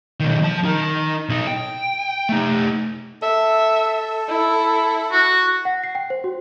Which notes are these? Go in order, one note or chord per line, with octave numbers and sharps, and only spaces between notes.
B2 D#3
F3 A5
D#4 A#4
B2 D#4
G5
A3 D#4
A4 E5
E4
F#4
F#5
C7
G5
C5
F#4